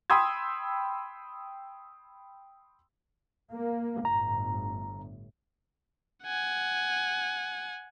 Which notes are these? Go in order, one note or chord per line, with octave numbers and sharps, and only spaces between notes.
G5 B5 C6 D#6 E6 G#6
A#3
G1 A2 A#5
F#5 G#5